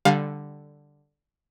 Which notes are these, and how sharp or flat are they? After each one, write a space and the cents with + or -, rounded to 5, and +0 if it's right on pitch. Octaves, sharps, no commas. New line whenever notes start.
D3 +0 G3 +0 F5 +25